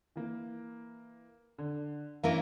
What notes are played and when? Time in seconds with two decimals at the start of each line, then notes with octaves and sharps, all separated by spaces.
0.16 E3 A#3
1.58 D3
2.24 E3 A3 A#3 C#4 D4 A#4